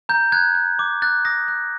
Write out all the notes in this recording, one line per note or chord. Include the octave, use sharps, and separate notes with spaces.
A#5 G6
F#6 G#6
F#6
D6
F#6 A6
D#6 A#6
F#6